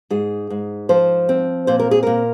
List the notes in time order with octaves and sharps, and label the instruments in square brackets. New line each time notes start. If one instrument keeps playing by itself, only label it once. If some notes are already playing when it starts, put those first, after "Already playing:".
[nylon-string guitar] G#2 G#4
G#2
F3 C5
C4
A#2 C5
A#4
G#4
A#2 A#4